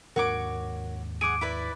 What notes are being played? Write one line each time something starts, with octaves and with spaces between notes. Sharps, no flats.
D#2 G#2 D4 F#4 A#4 C#5 D6
G#4 F#5 D6 D7 D#7
E4 B4 D5